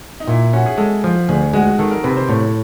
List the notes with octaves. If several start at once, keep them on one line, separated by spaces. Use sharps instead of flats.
D#4
A#2 E4
C#4 F#4
G#4
G#3 A4
F3
D2 G#4
G#3 F#4
F#4
D#3 A4
A#4
C3 B4
C5
A2 C#5